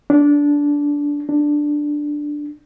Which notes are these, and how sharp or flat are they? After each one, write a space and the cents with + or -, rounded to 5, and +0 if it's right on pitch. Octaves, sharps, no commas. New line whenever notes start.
D4 -15
D4 +5